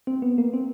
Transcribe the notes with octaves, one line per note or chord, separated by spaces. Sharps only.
C4
B3
A#3
C4